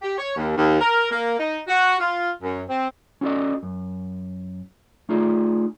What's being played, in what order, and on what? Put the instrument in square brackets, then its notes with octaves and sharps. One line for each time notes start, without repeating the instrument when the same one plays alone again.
[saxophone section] G4
C#5
D#2
D#2
A#4
A#3
D#4
F#4
F4
F#2
C4
[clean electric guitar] C#4 F#4 A4 D5 D#5
F#2
A3 D#4 F4 G#4 D5